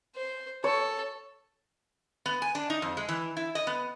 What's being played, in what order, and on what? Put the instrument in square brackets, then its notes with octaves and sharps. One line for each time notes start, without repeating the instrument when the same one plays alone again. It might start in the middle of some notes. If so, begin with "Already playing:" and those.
[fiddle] C5
[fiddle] A4 [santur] C#5
[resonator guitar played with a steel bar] B3
G#5
D4
D#4
F2
G#3
E3
E4
D#5
B3